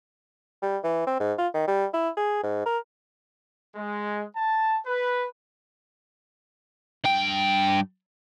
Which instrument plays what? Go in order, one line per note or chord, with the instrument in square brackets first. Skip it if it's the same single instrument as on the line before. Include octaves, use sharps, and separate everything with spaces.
[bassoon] G3
E3
C4
G#2
F4
D#3
G3
E4
G#4
G#2
A#4
[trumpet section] G#3
A5
B4
[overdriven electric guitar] G2 G5